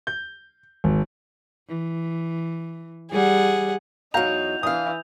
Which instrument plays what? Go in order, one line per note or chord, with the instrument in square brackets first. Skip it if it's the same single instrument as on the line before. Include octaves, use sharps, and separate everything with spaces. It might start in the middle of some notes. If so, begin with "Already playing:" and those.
[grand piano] G6
G#1
[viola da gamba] E3
[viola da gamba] G3 [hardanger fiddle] G#4 F#5
[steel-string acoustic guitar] E2 F#3 [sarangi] D#4 [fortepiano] F#4 F5 A#5 [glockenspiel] G6 F7
[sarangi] E3 [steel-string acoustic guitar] D4 F5 [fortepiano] D#6